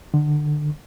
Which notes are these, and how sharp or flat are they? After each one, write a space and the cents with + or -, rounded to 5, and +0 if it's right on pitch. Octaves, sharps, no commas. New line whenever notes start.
D3 +25